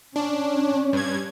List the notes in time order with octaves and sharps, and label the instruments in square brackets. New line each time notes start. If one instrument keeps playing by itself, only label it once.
[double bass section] C#4 [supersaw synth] D4
[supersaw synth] G2 G#6